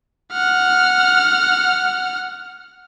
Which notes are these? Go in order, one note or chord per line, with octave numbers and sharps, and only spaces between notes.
F#5 F6